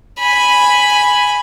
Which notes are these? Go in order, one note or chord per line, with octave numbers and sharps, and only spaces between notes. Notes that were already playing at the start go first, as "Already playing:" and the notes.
G#5 B5